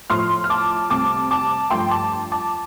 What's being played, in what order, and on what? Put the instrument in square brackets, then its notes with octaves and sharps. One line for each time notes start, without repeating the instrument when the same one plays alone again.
[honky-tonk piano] A2 F3 A3 C6 F6
F6
A5 D6
C2 C3 A3 A5 D6
A5 D6
G2 F3 A3 G5 C6
A5 D6
A5 D6